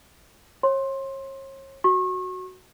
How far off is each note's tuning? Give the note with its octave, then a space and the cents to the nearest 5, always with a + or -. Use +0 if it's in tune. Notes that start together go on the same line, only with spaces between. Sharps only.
C#5 -40 C6 +15
F#4 +0 C#6 -35